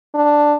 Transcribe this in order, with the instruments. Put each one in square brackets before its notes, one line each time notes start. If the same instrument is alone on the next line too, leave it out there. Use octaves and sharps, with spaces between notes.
[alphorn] D4